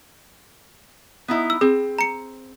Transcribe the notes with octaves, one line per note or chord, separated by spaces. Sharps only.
B3 D#4 E4
E6
C4 G#4
A#5 C#7